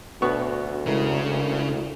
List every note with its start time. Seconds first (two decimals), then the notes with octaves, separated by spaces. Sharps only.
0.22 D2 B2 B3 C#6
0.87 C#3 G#3 E4 A#4